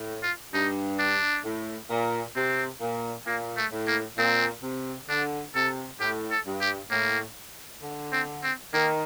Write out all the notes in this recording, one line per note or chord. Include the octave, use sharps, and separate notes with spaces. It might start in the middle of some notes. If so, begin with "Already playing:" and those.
Already playing: A2
F4
G2 D#4
D4
A2
A#2
C3 C4
A#2
A#2 A#3
A3
A2
A#3
A#2 C4
C3
D3 D4
C3 A4
A2 G4
A4
G2
G4
A2 A#3
D3
C4
C4
D#3 A#3